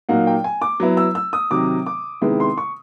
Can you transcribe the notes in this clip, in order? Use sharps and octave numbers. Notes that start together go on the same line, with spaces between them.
A#2 F#3 A#3 D#4 F#5
G5
G#5
D6
F#3 B3 E4
E6
E6
D#6
C3 D#3 F#3 D6
D6
C3 D#3 G#3 B3 E4
C6
C#6